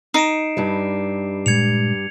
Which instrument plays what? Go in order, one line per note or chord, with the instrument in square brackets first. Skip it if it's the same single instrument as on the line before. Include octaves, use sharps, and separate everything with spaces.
[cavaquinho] D#4 [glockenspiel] C7 D7 E7
[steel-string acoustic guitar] G2 G3
[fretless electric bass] A#2 G#3 [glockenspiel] G#6 C#7 F7